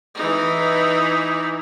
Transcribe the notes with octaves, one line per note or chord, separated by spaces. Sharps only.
E3 D#4